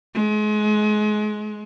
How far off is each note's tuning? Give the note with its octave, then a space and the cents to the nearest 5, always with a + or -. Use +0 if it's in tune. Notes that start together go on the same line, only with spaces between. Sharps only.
G#3 +30